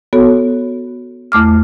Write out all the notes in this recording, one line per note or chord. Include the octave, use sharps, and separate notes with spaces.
B3 F#4 A4 C#5
E2 A3 D6 F6